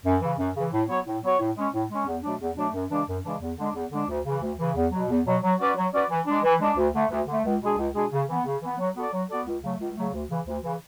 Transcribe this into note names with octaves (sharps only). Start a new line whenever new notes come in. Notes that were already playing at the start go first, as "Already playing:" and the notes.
F#2
C#3 E3
F#2
C#3 E3
A2
F#3 B3 F#4 C#5
A2
F#3 B3 F#4 C#5
A2
G#3 C#4
A2
G#3 C#4
E2
B2 F#3 A3 D4
E2
B2 F#3 A3 D4
F#2
C#3 E3 G#3 D4
F#2
C#3 E3 G#3 D4
E2
D3 G#3 D4
E2
D3 G#3 D4
D2
C#3 E3
D2
C#3 E3
E2
B2 F#3
E2
B2 F#3
F#3
C#4 F#4 B4 D5
F#3
C#4 F#4 B4 D5
E3
G#3 D4
E3
G#3 D4
D2
D3 A3
D2
D3 A3
C#2
B2 G#3 D4 G#4
C#2
B2 G#3 D4 G#4
C#3
E3 B3
C#3
E3 B3
F#3
B3 F#4 A4 D5
F#3
B3 F#4 A4 D5
C#2
C#3 F#3 A3
C#2
C#3 F#3 A3
D2
C#3 E3
D2
C#3 E3